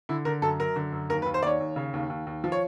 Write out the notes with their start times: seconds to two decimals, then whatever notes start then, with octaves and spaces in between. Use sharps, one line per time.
0.09 D3 E4
0.25 D3 A#4
0.42 F#2 A4
0.60 F#2 A#4
0.76 D3
0.92 F#2
1.09 D#2 A#4
1.22 B4
1.26 D#2
1.34 C5
1.43 D#2 C#5 D5
1.60 D#2
1.76 C#3
1.94 D#2
2.10 D#2
2.27 D#2
2.44 F3
2.52 C#5